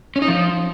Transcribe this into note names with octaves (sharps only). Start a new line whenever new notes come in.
C#4
D#4
F3